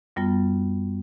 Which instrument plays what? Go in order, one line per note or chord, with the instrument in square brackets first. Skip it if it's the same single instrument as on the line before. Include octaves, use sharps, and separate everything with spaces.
[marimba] F#2 G3 B3 F4